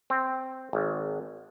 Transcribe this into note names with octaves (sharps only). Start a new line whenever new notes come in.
C4
G#1